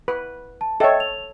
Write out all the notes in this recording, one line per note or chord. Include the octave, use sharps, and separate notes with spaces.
B4
A5
A4 C#5 D#5 E5 G5
F7